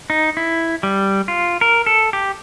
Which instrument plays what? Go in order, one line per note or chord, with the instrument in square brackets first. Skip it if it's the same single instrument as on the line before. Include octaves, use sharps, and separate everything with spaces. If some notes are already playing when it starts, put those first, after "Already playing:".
[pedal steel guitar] D#4
E4
G3
F4
A#4
A4
G4